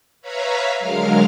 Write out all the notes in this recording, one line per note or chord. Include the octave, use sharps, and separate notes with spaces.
B4 C#5 E5 F5 A#5 B5
D3 F#3 G#3 A#4 F5 F6